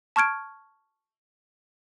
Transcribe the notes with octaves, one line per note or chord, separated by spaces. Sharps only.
A5 C#6 F6 G#6 D7